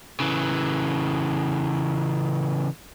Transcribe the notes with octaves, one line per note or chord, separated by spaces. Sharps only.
C#3 E3